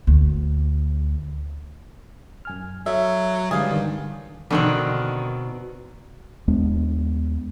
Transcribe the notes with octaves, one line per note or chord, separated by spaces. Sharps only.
D2
F#2 G#5 F6
F#3 A4 E5
G2 D3 E3 G#3 G#4 F5
D3 D#3 G3
B2 D3 D#3 C4 A#4 F#5
D#2 G#3 B3 D4